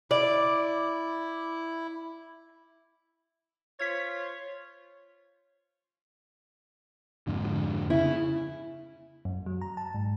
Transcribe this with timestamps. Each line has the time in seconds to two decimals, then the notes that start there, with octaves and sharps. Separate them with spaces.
0.11 E4 D5
3.79 F4 C5 C#5 G#6 B6
7.27 F2 G#2 D3
7.90 C#3 E4
9.25 F#2
9.46 F#3
9.61 A#5
9.77 A5
9.94 G#2